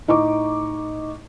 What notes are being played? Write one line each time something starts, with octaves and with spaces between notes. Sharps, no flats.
A2 D#4 D#5 C#6 D6